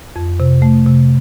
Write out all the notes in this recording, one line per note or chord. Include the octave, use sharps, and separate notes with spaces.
F2
C3
A3
C3